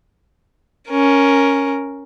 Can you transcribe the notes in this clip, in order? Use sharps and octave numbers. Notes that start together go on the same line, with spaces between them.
C#4 A#4